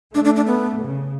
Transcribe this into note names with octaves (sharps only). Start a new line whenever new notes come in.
A3 D4
D4
D4
B3
C#3